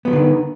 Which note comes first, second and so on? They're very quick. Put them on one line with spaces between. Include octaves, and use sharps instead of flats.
B3 F#3 F3 D3 D#3